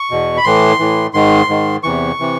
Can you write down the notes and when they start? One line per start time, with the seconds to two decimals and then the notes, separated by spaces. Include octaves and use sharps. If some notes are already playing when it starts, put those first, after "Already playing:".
Already playing: C#6
0.11 E2 B2
0.37 B5
0.44 A2 E3 C6
0.79 A2 E3
1.14 G#2 D#3 C6
1.49 G#2 D#3
1.83 E2 C3 E3 C#6
2.20 C3 E3